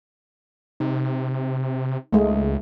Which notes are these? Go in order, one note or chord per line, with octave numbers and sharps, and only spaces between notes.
C3 D#4
C#2 G#3 A3